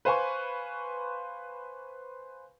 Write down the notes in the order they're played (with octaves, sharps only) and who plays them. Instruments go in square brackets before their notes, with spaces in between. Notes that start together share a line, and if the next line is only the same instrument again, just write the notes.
[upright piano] B4 C5 F5 G#5 C#6